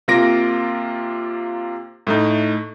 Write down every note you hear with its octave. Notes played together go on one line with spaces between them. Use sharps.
C3 A#3 F4 A#6 D7
A2 A3 D#4